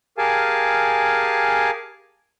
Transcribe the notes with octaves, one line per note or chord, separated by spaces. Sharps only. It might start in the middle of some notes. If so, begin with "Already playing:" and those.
G4 G#4 A#4 F5 G#5 A5